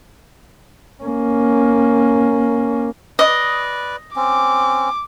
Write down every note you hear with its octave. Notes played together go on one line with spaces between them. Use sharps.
A#3 C#4
B4 D5 D#5
C4 C#4 D6